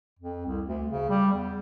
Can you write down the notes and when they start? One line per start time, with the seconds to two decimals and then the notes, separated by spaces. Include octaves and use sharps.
0.19 F2
0.45 C2
0.67 D2
0.89 C#3
1.09 G3
1.32 E2